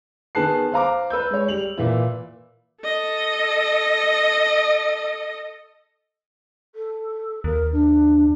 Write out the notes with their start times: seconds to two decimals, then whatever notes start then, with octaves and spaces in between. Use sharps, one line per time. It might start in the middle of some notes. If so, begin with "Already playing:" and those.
0.35 D#3 B3 G#4 A5 F#6 C7
0.72 C5 F5 A#5 D6
1.10 B4 E6 G6
1.30 G#3 C#5
1.48 G3 F7 F#7
1.78 A#2 E3 E4
2.83 A4 D#5
6.75 A4
7.44 D#2 A#4
7.72 D4